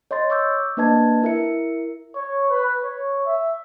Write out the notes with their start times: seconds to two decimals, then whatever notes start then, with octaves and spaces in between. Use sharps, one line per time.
0.11 C#5 D#5 C6 A6
0.30 C#6 D6 E6 G6
0.77 A#3 D4 B4 D#5 A5 G#6
1.23 E4 A#4 E5 C#7
2.15 C#5
2.50 B4
2.83 C#5
3.26 E5